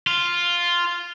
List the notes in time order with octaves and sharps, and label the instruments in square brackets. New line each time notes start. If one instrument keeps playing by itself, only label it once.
[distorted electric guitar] F4